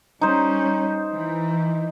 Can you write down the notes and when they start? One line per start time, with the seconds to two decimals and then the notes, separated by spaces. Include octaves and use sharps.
0.21 G3 C#4 D#4 C5
1.12 E3